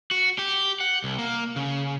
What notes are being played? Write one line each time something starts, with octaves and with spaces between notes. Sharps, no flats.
F#4
G4
F#5
C2
A#3
C#3